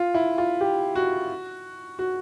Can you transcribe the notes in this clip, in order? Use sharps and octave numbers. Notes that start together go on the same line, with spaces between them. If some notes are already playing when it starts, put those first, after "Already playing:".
Already playing: F4
E4
F4
G4
F#4
F#4